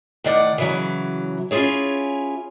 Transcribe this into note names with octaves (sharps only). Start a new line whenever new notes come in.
A2 D#3 D5 F#5
C#3 E3 F#3
C#4 E4 F4 G#4 C#5